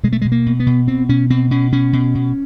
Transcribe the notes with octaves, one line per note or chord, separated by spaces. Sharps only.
B2 G#3
A3
G#3
B2
A#3
B2
B3
B2
B2 C4
B2 C#4
B2 C4
B2 C#4
B2 C#4
B2
B2